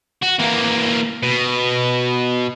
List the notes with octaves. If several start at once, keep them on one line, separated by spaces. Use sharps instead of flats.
F#4
E3 A#3
B2